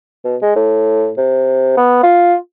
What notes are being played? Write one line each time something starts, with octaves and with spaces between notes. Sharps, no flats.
B2
G#3
A2
C3
B3
F4